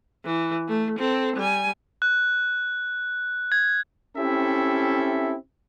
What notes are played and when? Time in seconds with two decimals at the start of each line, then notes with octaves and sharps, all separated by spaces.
0.25 E3
0.68 A3
0.99 C4 A4
1.36 G3 G#5
2.02 F#6
3.52 G#6
4.17 C4 C#4 E4 G4 A4 E5